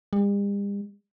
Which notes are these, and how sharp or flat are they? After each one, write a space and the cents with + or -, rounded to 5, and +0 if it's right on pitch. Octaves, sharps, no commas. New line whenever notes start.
G3 +45